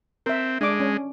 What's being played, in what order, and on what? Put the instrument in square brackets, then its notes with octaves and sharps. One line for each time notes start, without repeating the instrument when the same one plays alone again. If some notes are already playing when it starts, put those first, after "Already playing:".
[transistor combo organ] C4 [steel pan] A#4 E5
[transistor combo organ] G#3 [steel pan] D4 D6
[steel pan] C#4